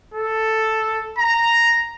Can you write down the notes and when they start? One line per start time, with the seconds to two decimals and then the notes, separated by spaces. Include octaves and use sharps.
0.14 A4
1.19 A#5